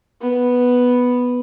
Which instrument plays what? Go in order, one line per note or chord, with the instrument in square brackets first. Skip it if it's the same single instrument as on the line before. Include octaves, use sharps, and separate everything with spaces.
[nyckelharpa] B3